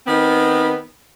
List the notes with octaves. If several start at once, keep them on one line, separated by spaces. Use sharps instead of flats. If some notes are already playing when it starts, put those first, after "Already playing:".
D#3 B3 C4